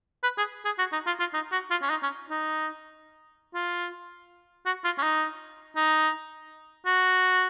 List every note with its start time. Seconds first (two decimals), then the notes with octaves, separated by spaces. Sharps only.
0.23 B4
0.38 G#4
0.65 G#4
0.78 F#4
0.92 D#4
1.06 F4
1.20 F4
1.33 D#4
1.52 F#4
1.70 F4
1.82 C#4
1.90 D#4
2.03 C#4
2.30 D#4
3.54 F4
4.66 F#4
4.84 F4
4.98 C#4
5.02 D#4
5.76 D#4
6.86 F#4